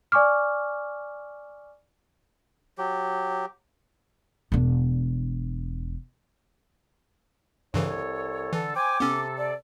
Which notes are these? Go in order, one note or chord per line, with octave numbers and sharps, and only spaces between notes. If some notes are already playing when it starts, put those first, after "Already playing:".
D5 G#5 C#6 D6 F6
F#3 G4
E1 D4
C2 G2 C#3 E3 A4 C#5
D3 E3 A4
C5 G5 G#5 D6
C3 B3 C#4 A4
D5